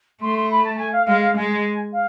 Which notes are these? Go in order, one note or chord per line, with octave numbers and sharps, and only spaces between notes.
A3 C6
C6
B5
A5
A5
G#5
F5
G#3 F5
F5
G#3 G#5
F5